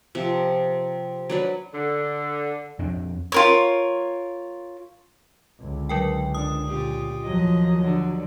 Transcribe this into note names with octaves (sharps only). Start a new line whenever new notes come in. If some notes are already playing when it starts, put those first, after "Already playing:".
C3 F3
F#3 D4 B4
D3
F2 C4 D4
F4 A#4 C#5
C#2 D3
F#3 A#4 G5
D4 D#6
A#2 F4 G4
D#2 F3 F#3 D#5
D3